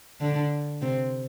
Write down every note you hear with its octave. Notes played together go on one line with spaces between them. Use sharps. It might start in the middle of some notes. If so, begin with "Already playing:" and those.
D3 D4
C3 C4